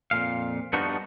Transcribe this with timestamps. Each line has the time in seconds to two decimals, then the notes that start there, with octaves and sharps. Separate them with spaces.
0.11 F2 A#2 F5
0.73 G2 F3 B3 D4 D#4 F#4